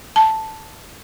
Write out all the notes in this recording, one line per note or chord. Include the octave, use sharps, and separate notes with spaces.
A5